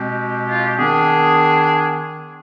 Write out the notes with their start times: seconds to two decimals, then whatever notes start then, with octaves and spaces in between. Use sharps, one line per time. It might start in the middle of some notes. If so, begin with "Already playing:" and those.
Already playing: B2 G#3 C4 G4
0.49 F4
0.63 G4
0.76 D#3 B3 D4 G#4